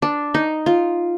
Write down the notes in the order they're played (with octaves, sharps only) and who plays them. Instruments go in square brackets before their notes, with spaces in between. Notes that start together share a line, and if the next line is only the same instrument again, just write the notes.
[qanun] D4
D#4
F4